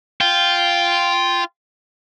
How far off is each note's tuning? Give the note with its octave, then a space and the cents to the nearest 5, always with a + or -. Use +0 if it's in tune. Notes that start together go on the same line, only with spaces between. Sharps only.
F4 -5 G5 +0